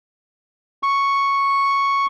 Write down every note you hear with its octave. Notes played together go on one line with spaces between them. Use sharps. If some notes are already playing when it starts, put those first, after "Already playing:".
C#6